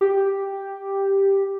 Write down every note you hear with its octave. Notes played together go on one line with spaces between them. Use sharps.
G4